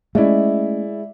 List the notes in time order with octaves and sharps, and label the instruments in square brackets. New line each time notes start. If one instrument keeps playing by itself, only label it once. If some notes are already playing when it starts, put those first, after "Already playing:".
[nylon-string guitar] G#3 [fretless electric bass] A3 C#4 [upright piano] E4 D5 E5